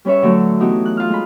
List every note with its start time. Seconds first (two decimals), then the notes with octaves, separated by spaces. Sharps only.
0.05 G3 C#4 B4 C#5 E5
0.22 D3 F#3 A3
0.60 E3 B3 D#4 E4 F#4 G4
0.85 F#6
0.97 F4 F6
1.10 G#3 B5